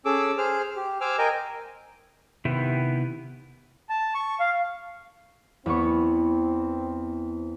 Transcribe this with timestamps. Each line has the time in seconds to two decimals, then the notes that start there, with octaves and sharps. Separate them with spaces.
0.05 C#4 G#4 A4 D6 E6
0.38 G#4 C5 F6
0.76 G4
1.01 C5 G#5 D6 E6 F6
1.19 A#4 D#5 G5 G#5
2.45 C3 D#3 B3 E4 G4
3.89 A5
4.15 C#6
4.40 F5
5.66 E2 B3 C4 C#6